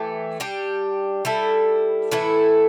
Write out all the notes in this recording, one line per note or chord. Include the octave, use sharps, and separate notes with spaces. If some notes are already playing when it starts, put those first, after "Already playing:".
Already playing: E3 A3 G4
G3 D4 G4
G3 E4 A4
A2 E3 A3 E4